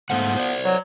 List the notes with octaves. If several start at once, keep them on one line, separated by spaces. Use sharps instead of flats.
G#2 F3 A3 B3 F#5
C5 D5
F#3